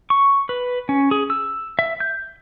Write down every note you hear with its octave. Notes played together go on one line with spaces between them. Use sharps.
C#6
B4
C#4
G#4
E6
E5
G6